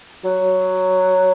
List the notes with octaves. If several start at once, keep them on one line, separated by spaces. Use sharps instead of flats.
F#3